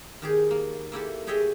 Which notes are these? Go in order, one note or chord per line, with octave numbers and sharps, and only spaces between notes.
D#3 G4 G#4
A#3
A#3 E4 G4 A4
G4 G#4 C#5 D#5 E5 G5